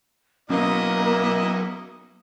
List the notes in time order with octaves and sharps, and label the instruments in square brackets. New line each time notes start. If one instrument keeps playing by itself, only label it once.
[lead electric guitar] F#3 B3 [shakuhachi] A#3 [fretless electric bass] C#4 [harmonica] E4 D#5